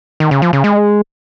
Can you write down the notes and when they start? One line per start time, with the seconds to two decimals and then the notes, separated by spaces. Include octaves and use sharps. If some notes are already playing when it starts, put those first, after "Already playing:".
0.20 D#3
0.31 C#3
0.42 F3
0.53 C#3
0.64 G#3